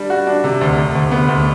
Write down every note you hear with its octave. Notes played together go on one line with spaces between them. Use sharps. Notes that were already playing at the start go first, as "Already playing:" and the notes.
Already playing: G3 D4
F#4
D4
C3
D2
D2
D2
B3
D2